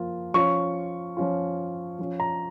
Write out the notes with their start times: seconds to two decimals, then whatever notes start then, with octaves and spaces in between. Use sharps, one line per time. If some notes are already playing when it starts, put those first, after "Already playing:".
Already playing: F3 A#3 F4
0.34 F3 C#4 F4 C#6
1.17 F3 C#4 F4
1.99 F3 C#4 F4
2.20 A#5